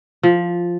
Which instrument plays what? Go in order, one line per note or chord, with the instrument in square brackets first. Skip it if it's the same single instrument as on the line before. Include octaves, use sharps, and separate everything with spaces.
[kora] F3